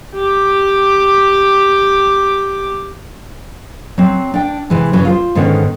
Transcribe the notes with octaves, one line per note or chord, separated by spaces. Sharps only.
G4 D6
F#3 C4
D4 G5
C3 E3 G#3
G2 C#3 E3 F#3
F4 G#4 C5
G#2 D3 D#3 B3 C#4